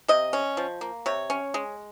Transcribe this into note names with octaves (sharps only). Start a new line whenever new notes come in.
C3 D#5
C#4
F3
A#3
C3 C#5
C#4
G#3